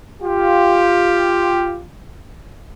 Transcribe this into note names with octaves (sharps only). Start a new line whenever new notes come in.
F4 G4